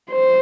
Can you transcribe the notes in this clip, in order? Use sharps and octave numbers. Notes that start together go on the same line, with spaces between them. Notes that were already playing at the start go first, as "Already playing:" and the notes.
C5